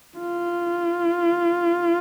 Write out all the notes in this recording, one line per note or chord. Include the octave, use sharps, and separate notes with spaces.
F4